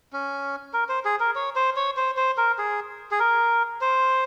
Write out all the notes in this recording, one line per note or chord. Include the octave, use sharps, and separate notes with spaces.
C#4
A#4
C5
G#4
A#4
C#5
C5
C#5
C5
C5
A#4
G#4
G#4
A#4
C5